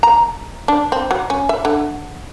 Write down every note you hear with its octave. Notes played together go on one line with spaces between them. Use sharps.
A#5
D4
C4
F#3
C#4
E5
D3